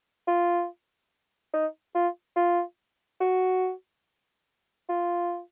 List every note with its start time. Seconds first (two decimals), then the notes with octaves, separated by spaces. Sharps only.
0.28 F4
1.54 D#4
1.95 F4
2.36 F4
3.21 F#4
4.89 F4